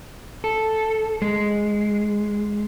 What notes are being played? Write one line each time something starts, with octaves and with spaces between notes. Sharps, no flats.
A4
G#3